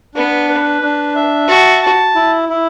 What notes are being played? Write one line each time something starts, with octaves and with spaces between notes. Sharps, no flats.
B3 D4
B4
D4
E5
F#4 A5
A5
E4
E4